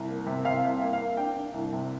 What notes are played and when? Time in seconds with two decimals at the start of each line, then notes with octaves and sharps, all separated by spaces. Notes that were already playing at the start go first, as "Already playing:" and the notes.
Already playing: C2
0.08 A#3
0.26 C3
0.44 C3 F5
0.63 C2
0.69 F5
0.82 A#3
0.93 F5
1.00 A#3
1.17 D4 G5
1.36 D4
1.54 C2
1.72 C3